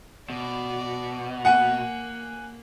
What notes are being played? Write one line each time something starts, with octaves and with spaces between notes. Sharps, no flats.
B2 D5
A#3 F#5 G#5 C#7